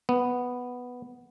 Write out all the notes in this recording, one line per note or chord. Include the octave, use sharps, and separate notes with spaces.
B3